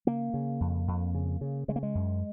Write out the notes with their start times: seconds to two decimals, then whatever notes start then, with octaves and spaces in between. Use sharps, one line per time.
0.07 C#3 A#3
0.34 C#3
0.61 F2
0.88 F2
1.15 C#3
1.41 C#3
1.68 C#3 G#3
1.76 A#3
1.83 G#3
1.95 F#2